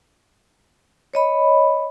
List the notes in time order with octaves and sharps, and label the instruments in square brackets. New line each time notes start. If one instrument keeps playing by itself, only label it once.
[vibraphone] C#5 D#5 B5